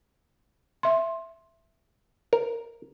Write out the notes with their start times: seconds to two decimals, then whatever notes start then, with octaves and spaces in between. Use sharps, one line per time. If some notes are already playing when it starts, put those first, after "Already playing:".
0.83 E5 C6
2.33 A#4